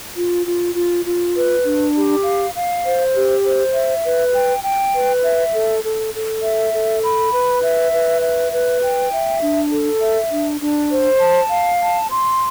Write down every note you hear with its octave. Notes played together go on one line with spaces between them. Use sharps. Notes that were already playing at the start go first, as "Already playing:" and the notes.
F4
F4
F4
F4
B4
D4
G4
F5
F5
C5
G4
C5
E5
B4
G5
G5
B4
E5
A4
A4
A4
E5
A4
B5
B4
E5
B4
E5
B4
G5
E5
D4
A4
E5
D4
D4
C5
A5
F5
A5
C6